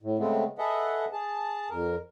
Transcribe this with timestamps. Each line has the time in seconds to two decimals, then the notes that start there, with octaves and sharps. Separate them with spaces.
0.02 A2
0.19 C#3 G#3 A3 B3 C4
0.58 G#4 A4 B4 D#5 E5 F#5
1.12 G#4 A5
1.70 F2 A#4